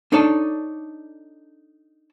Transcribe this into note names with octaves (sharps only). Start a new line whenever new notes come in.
D4 D#4 A4 C#5 D5 A5